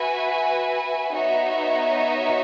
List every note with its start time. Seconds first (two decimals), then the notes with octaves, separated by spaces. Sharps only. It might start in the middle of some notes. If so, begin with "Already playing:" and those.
Already playing: F#4 B4 E5 G#5
1.13 B3 D#4 F#4 C#5 E5